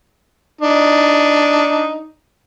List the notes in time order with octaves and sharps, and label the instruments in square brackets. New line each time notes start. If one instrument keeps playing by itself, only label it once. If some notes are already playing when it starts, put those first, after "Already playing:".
[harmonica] D4 D#4